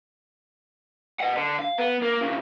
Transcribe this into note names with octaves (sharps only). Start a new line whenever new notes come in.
D#5 F#5
D3
F5
B3
A#3
B1 C#3